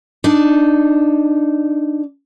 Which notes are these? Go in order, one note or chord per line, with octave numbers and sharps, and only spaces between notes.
D4 D#4